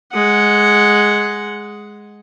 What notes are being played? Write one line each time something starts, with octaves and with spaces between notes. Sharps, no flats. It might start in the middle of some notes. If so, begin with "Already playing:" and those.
G#3 F#5